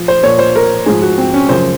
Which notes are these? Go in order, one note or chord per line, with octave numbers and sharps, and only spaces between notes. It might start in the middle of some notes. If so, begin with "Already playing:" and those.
Already playing: F3
C5
A#2 F3 C#5
C5
A#4
G#2 F3 G#4
F#4
C4
C#4
F#2 C#3 F3 C5